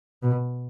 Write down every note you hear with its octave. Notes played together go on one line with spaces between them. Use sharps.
B2